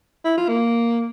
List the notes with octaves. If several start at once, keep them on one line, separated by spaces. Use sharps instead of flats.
E4
F4
A#3